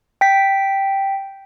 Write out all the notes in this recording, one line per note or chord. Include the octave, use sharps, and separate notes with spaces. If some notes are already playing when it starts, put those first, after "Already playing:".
G5 B6